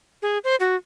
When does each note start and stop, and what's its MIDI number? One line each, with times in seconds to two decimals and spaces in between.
0.22 0.38 68
0.44 0.56 72
0.60 0.76 66